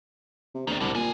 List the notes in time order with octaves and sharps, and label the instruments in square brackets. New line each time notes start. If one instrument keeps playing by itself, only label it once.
[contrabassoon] C3
[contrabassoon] D2 [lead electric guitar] D#3 D4
[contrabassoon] C2 [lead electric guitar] B2 D3
[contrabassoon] A#2 [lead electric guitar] A4 G#5